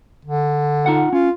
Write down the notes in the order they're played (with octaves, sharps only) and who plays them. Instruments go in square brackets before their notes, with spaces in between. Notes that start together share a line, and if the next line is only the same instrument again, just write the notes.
[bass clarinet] D3
[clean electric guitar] D#4 F4 F#5
[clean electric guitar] C#4 [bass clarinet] F4